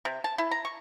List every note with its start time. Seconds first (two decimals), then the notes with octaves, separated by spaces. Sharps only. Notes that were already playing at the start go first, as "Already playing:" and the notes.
0.05 C3
0.24 A5
0.38 E4
0.51 A#5
0.65 C#6